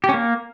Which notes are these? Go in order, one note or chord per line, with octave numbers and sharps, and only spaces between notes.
G4
C#4
A#3